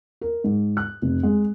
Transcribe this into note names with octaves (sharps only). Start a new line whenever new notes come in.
A#4
G#2
F#6
F1
G#3